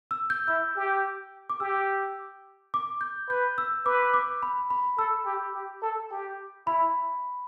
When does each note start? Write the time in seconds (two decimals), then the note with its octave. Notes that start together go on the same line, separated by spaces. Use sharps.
0.11 E6
0.30 G6
0.48 E4 E6
0.76 G4
1.50 D6
1.60 G4 E6
2.74 D6
3.01 G6
3.29 B4 G6
3.58 E6
3.85 B4 D6
4.14 D6
4.43 B5
4.70 B5
4.98 A4 E6
5.26 G4
5.55 G4
5.82 A4
6.11 G4
6.67 E4 B5